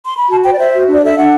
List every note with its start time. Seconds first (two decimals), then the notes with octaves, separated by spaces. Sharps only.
0.05 C6
0.17 B5
0.29 F#4 A5
0.44 C5 G5
0.53 D5
0.59 C5 E5
0.74 F#4
0.88 D4 D5
1.02 A4 E5
1.17 D4 F#5